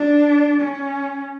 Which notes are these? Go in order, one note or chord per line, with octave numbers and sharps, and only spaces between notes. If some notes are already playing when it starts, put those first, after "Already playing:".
Already playing: D4
C#4